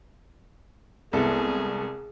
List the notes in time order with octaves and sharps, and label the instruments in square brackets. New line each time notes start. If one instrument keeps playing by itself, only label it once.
[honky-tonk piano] C2 B3 [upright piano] G#3 E4 A4 [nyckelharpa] G#4